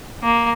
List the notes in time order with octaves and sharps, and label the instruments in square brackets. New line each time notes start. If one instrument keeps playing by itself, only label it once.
[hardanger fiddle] A#3